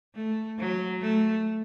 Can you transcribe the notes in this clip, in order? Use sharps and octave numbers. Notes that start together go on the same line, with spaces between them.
A3
F#3
A3